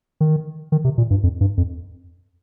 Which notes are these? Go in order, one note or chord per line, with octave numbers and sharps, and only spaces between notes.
D#3
D#3
C3
A#2
G2
F2
G2
F2